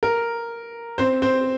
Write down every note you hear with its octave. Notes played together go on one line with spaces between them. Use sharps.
A#4
C4 C5
C4 C5